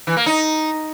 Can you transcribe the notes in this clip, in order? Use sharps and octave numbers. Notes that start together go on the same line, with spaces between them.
E3
A#3
D#4